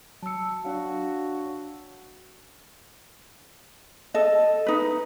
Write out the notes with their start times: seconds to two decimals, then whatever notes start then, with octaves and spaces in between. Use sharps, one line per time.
0.23 F#3 A5 E6 C#7
0.65 D4 F#4 C#5 F5
4.14 A4 D#5
4.67 D#4 B4